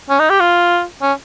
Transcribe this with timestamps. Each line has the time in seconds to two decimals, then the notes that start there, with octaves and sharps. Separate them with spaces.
0.10 C#4
0.19 D#4
0.30 G4
0.40 F4
1.02 C#4